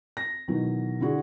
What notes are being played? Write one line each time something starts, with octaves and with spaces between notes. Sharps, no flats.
A#6
B2 D#3 E3 F#3
D3 E4 F#4 G#4